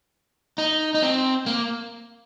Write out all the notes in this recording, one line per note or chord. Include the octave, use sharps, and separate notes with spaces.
D#4
D#4
C4
A#3